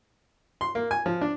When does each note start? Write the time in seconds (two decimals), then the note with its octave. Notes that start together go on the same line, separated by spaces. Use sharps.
0.61 C6
0.75 A#3
0.91 G#5
1.06 F3
1.21 D4